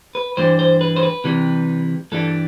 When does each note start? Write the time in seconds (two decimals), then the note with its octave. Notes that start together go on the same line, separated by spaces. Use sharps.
0.15 B4
0.37 G2 E3 G3 D4 C5
0.59 C5
0.81 B4
0.96 C5
1.03 B4
1.24 C3 E3 G3
2.12 G2 E3 G3 D4 A4